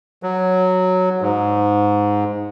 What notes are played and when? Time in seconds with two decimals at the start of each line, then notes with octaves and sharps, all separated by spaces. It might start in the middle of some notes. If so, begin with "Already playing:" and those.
0.23 F#3
1.21 G#2